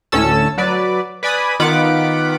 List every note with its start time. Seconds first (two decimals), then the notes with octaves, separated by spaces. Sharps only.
0.12 D2 A2 C#4 A4 A5 E6
0.58 F#3 B4 D5
1.23 B4 D5 G#5 B5 D#6
1.60 D#3 B3 F4 F#5 B5 D6